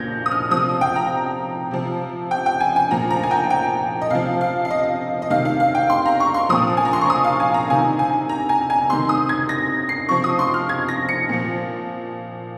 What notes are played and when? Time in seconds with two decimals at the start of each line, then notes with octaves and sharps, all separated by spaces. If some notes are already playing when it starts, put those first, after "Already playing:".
Already playing: A#2 F3 G6 G#6 A#6
0.26 D#6
0.31 F6
0.51 C3 F3 D#6
0.81 G5
0.96 A#5
1.71 C3 F3
2.31 G5
2.46 G5
2.60 G#5
2.76 G#5
2.91 A#2 F3 A#5
3.10 A#5
3.23 G#5
3.31 G5
3.50 G5
4.02 D#5
4.11 C3 F3 F5
4.41 F5
4.65 F5
4.70 D#5
5.22 D#5
5.30 C3 D#3 F5
5.45 F5
5.60 F5
5.75 G5
5.90 C6
6.05 A#5
6.20 C#6
6.34 C6
6.49 A#2 F3 D#6
6.77 G#5
6.85 A#5
6.93 C6
7.01 C#6
7.10 D#6
7.24 F5
7.40 G#5
7.54 A#5
7.69 C3 D#3 G#5
7.99 G#5
8.29 A#5
8.49 G#5
8.70 G#5
8.89 C3 D#3 C6
9.09 D#6
9.29 G#6
9.49 A#6
9.89 C7
10.09 C3 F3 C#6
10.24 D#6
10.39 C6
10.54 F6
10.69 G#6
10.89 A#6
11.09 C#7
11.29 A#2 F3